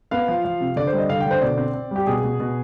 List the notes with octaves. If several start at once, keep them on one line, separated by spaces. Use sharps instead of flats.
B3 F5
F3
F3
C3
D3 D5
C5
G3
D#5
D3 F5
G5
D3
C5
B2 D5
C4
C4
G3 G4
B2 G#4
B2
B2